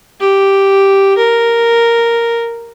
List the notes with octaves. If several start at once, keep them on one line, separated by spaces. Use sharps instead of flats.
G4
A#4